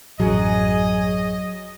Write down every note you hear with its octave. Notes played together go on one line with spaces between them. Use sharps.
A1 F#2 F#3 G#4 D#5